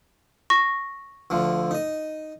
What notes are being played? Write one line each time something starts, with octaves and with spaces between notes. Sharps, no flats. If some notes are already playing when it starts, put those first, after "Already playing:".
C#6 A#6
D2 D3 F3
D#4 D#5